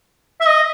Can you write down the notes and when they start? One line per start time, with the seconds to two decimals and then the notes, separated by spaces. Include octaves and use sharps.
0.41 E5
0.46 D#5